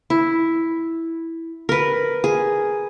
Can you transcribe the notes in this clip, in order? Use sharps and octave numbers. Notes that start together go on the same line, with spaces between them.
E4
A#4 B4
G#4